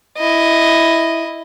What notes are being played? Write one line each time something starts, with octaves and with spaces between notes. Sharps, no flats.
E4 D#5